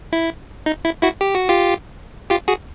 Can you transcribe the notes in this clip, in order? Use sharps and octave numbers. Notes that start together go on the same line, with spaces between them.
E4
D#4
E4
E4 F#4
G4
F#4
F4 G4
F4 G4
F#4 G#4